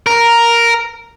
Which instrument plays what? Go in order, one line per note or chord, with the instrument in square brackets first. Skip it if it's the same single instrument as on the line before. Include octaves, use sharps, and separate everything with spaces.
[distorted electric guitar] A#4